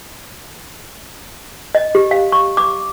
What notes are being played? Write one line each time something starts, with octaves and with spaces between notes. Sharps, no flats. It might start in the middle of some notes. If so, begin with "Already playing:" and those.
D#5
G4
F5
C#6
D6